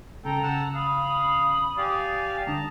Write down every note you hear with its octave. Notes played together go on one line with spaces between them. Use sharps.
C#3 A4 G5 A#5
F#5 A5 E6
F5 B5 D#6
G4 D5 F5 G#5
D3 A5 A#5 D#6